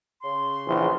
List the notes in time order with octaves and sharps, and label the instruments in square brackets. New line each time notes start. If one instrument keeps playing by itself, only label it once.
[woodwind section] C#3 C6
[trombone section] A#1 E3